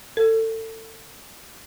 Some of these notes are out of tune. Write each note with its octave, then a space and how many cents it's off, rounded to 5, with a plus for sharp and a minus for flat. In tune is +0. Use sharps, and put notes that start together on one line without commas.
A4 +25